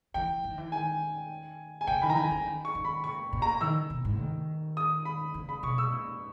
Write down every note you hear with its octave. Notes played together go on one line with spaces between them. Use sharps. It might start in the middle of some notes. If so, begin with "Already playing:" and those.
E3 G5
E3
D#3
E3
D#3 G#5
G#5
C#3 G5
D#3 B5
E3 A#5
D#3 G#5
E3
D#3
C#6
D#3
B5
A#2 C#6
A#2
A#5
D#3 E6
B2
G#2
D#3
D#6
B5
C#3
B5
B2 C#6
E6
A#2